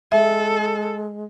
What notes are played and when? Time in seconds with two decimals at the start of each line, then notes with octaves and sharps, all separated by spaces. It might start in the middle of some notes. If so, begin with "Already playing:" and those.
0.12 G#3 A4 E5